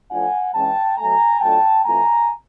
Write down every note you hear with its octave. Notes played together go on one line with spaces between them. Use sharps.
F3 A3 D4 F4 F#5 G#5
E3 G#3 C#4 G5 A5
B2 F#3 A3 G#5 A#5
F#3 A3 D4 F4 G5 A5
E3 A3 C4 F4 G#5 A#5